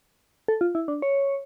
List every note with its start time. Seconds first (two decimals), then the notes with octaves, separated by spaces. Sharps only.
0.48 A4
0.61 F4
0.75 E4
0.88 D4
1.02 C#5